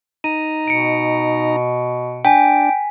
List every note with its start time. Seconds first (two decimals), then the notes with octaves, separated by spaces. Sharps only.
0.24 D#4 A#5 D#7
0.68 B2 C#7 D7
2.25 D4 G5 G#5 B6